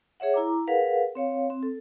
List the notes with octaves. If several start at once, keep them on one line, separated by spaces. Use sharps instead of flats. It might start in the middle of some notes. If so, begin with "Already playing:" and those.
G#4 C#5 E5 F#5
E4 A#5 D6
G#4 A#4 B4 F5 F#5
C4 C#5 F5
C4
A4